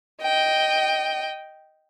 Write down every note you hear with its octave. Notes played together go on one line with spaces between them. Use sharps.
D#5 G5